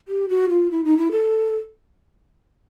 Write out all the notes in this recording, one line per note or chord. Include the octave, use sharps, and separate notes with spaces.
G4
F#4
F4
E4
D#4
E4
A4